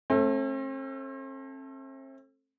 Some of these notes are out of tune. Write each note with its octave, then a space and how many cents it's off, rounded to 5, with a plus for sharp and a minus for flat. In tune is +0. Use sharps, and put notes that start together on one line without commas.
A3 +0 C4 +45